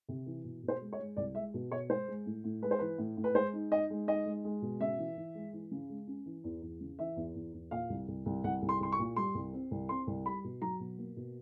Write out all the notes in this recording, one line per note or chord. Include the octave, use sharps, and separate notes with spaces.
C3
E3
B2
B2
C5
G#3
C#5
G#3
C2 D5
G#3 E5
B2
B2 C#5
G#3 C5
G#3
A2
A2
G#3 B4
C5
E3 B4
A2
A2
B4
G#3 C5
D#4
D#4 D#5
G#3
D#4 D#5
G#3
G#3
B2
C#3 E5
E3
E3
G#3
E3
C#3
G#3
C#4
E3
E2
E2
C#3
E3 E5
E2
E2
E2
A#2 F5
C2
C2
C2
C2 F#5
C2
C6
C2 C6
C#6
A#2
G3 C6
C2
C4
C2
C4 C6
C2
G3 B5
B2
F#3 A#5
B2
A#3
B2